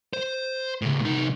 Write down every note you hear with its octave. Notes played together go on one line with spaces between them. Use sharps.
C5
A2 C#3
C2 D#4